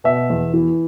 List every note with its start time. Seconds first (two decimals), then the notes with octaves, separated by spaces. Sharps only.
0.04 B2 E5
0.30 E2
0.54 E3